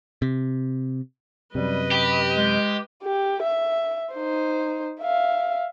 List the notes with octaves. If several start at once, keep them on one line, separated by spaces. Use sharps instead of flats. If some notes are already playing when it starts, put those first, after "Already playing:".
C3
F#2 C3 G3 B4 D#5
G4 B5
G#3
G4
E5
D#4 C5
E5 F5